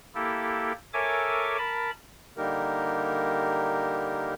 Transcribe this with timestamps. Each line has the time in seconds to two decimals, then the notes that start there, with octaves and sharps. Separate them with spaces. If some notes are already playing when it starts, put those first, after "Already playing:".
0.15 A#3 E4 G4 A4
0.94 A4 A#4 C#5 E5 G#5 D6
1.58 A#4 A5 B5
2.37 D3 G3 A#3 D#4 G4 A#4